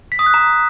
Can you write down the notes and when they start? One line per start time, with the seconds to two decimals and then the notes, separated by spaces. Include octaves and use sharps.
0.12 B6
0.19 D#6
0.26 F#6
0.34 A#5